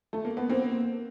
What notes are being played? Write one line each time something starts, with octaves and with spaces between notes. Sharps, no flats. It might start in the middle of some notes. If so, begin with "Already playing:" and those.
A3
A#3
B3
A#3 C4